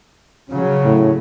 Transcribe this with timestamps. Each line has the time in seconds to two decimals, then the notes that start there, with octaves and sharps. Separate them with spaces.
0.50 C#3 F#3
0.85 A2